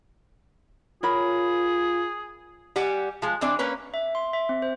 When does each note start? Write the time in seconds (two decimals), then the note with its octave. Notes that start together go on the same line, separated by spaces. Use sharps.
1.03 F4 G#4 A#4 C#5 B5
2.76 G3 G4 F#5 G#5
3.22 F3 G#3
3.41 E3 C4 D4 D5
3.59 A#3 C#4 B4 C#5
3.94 E5
4.15 C6
4.33 E5
4.49 C4
4.62 C5